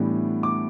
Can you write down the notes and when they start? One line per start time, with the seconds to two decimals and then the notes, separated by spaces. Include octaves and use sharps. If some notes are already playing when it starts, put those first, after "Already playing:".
Already playing: A2 E3 G3 B3 D4
0.43 D6